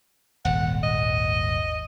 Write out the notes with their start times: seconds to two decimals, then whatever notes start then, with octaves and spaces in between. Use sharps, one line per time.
0.45 D#1 G#1 F#5
0.83 D#5